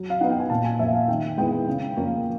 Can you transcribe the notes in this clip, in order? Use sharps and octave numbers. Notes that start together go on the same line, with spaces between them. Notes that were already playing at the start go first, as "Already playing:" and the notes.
Already playing: F#3
F5
B3 D#4 F#5
G5
G#5
A#2 A5
G#5
F3 A#3 E5
F5
D#3 G5
G#3 B3 E4 G5
C#3
F3 A#3 C#4